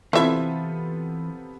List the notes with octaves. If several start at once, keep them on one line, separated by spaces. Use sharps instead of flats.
C3 E3 B3 C4 E4 F4 A4 E5